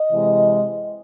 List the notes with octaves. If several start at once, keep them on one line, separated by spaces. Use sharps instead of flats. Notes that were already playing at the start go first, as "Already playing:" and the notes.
Already playing: D#5
C3 E3 G#3